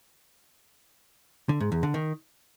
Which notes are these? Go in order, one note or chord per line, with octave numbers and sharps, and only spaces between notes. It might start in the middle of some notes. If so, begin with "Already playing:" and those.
D3
G#2
E2
D3
D#3